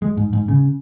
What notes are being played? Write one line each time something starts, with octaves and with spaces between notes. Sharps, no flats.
G#3
G#2
G#2
C#3